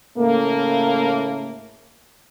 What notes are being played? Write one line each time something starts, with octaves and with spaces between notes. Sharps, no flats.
A2 C#3 A3 A#3